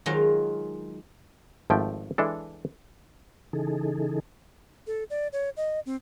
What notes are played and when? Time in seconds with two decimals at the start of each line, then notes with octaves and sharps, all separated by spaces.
0.06 D#3 F#3 G#3 F4
1.70 G#1 F3 A3 G5
2.18 E3 G#3 D4 A4
3.53 C#3 E3 D#4 G#4 A4
4.87 A4
5.10 D5
5.33 C#5
5.57 D#5
5.86 C4